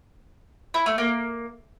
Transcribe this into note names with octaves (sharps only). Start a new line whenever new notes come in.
E4
A3
A#3